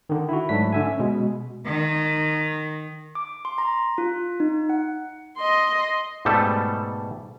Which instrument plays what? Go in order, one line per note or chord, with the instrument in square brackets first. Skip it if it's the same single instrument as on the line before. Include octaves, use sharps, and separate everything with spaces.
[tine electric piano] D3 D#3
E4 F#4
G#2 F#3 A3 D4 B6
D3 E5 G#5
C#4
B2 G#3
[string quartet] D#3
[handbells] D6
C6
A#5
F4
D#4
F#5
[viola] D#5 C6
[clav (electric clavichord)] G#2 B2 G3 A3 A4